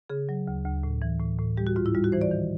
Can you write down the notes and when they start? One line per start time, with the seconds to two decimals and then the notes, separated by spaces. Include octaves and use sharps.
0.10 C#3 G#4
0.29 F#3
0.47 D2
0.65 D2
0.83 A2
1.02 E3
1.20 A2
1.39 A2
1.57 G3 G4
1.67 F#4
1.76 G#2 F4
1.86 E4
1.95 G3 F4
2.04 F#4
2.12 E3 C5
2.21 D5
2.31 D#3